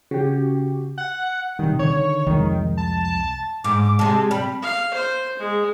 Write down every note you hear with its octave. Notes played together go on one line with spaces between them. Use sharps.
C#3 F#4 G4
F#5
C3 D#3 G3
D3 D#3 C#5
C2 F2 D#3 G#3
A5
A5
G#2 D6
D6
C3 G#3 A5
G3 B5
F5
C5
G#3